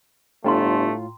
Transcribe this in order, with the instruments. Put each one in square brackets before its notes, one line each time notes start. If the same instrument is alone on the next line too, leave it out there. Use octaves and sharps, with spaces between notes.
[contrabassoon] G1 [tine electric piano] A2 F4 [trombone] A3 [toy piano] G5 A#5 C6